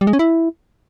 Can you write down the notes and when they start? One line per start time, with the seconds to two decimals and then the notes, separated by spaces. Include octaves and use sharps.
0.01 G3
0.07 G#3
0.13 C#4
0.19 E4